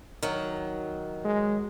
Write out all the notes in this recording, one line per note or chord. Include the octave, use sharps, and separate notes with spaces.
D#3 F#3
G#3